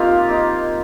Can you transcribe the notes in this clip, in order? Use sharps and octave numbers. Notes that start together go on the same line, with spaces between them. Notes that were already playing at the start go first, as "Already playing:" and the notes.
Already playing: A#3 C4 D#4 F4 G4 A#4 F5
A#3 D#4